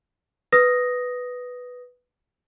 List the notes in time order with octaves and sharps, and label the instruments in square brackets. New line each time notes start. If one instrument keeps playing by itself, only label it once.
[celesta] B4 D#6 A#6